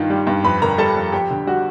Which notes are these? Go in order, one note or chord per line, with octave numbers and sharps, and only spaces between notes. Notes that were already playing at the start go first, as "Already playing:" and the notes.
Already playing: G2 D#3 F4
G3
G2
F2 B4 B5
D3 A#4 A#5
G3 A4 A5
F2
F2 G4 G5
D3
G3 F#4 F#5